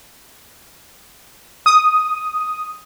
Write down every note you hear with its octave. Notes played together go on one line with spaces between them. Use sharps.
D#6